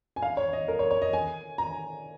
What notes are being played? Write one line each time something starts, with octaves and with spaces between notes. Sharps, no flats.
G#5
F5
C#5
D#5
A#4
C#5
C#5
D#5
G#5
A#5